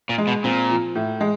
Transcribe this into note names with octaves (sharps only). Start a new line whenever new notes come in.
A#2
G#3
B2
A#2 C4
F3
A2
G#3